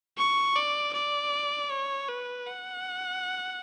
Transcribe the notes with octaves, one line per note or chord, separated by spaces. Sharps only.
C#6
D5
D5
C#5
B4
F#5